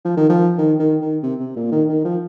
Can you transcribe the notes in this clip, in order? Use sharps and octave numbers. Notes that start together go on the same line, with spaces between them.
F3
D#3
F3
D#3
D#3
D#3
C3
C3
A#2
D#3
D#3
F3